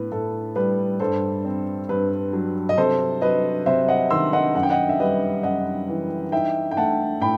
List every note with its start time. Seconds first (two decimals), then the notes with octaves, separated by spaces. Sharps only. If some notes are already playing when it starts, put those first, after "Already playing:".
Already playing: A2 B3 B4
0.11 A2 A4
0.56 G3 B4
1.00 G2 A4 C5
1.45 C4
1.89 G2 B4
2.33 F#3
2.69 D#5
2.77 C3 A4 C5
3.22 F#3 B4 D#5
3.66 C3 C5 E5
3.88 D#5 F#5
4.10 D#3 C6 E6
4.33 D#5 F#5
4.55 F#2 F#5
4.63 G5
4.70 D#5 F#5
4.89 E5
5.00 G3 B4 D#5
5.43 F#2 D#5 F#5
5.88 E3
6.32 D#4 E5 G5
6.71 G5
6.77 A3 F#5 A5
7.21 A2 G5 B5